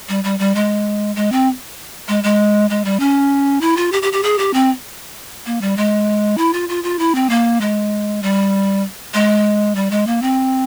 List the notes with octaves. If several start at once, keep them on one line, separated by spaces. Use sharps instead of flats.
G3
G3
G3
G#3
G#3
C4
G#3
G#3
G#3
G3
C#4
E4
F4
G4
G4
G4
G#4
G4
C4
A#3
G3
G#3
E4
F4
F4
F4
E4
C4
A#3
G#3
G3
G#3
G3
G#3
A#3
C4